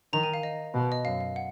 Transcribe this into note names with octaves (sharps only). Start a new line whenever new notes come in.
D#3 A#5
G#5
F5
D#5
B2
D#5
F#2 F5
F5
F#5